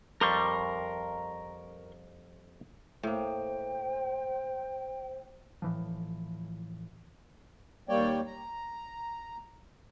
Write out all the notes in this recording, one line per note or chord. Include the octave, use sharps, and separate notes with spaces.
F2 G3 A#4 C6 C#6
A2 A#3 C5 G5
A2 E3 F3
D#2 G3 A#3 C#5 D5 G5
A#5